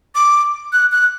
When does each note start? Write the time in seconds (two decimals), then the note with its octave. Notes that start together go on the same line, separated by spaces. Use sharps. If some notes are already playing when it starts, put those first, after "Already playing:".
0.15 D6
0.73 F#6
0.92 F#6